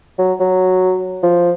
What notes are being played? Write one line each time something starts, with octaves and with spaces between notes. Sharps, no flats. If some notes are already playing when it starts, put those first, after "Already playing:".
F#3
F#3
F3